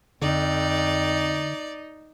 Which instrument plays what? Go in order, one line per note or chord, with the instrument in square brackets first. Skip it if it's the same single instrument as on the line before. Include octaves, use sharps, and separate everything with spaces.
[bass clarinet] F2 [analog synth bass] D3 [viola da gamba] D#4 [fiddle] D5